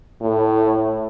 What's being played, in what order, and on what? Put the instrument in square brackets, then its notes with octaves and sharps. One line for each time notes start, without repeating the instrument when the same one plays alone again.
[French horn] A2